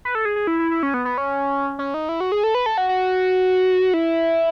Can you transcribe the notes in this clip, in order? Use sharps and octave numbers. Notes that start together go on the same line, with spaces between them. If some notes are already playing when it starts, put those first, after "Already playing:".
B4
A4
G#4
G#4
E4
E4
E4
C#4
B3
B3
C#4
C#4
D#4
E4
F#4
G#4
A4
B4
A4
F#4
F#4
E4